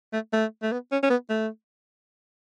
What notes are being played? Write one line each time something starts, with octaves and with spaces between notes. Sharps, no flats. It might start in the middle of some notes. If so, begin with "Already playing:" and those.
A3
A3
A3
B3
C#4
C#4
B3
A3